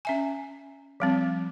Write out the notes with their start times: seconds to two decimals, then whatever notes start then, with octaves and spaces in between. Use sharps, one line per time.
0.05 C#4 E5 G#5
1.00 F3 G3 C4